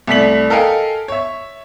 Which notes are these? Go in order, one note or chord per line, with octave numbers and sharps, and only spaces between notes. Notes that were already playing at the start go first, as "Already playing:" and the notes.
C2 A3 D5 B6 F#7
A4 A#4 D#5 F5 G5 G#5
C#5 E5